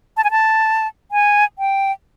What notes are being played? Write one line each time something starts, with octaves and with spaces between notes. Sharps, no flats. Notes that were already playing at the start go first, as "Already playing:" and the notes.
A5
G#5
A5
G#5
G5